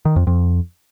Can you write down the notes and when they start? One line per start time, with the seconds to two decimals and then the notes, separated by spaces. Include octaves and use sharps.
0.05 D#3
0.16 F2
0.27 F2